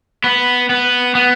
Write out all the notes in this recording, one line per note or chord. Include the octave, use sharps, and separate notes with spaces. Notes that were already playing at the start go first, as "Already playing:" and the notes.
B3
B3
B3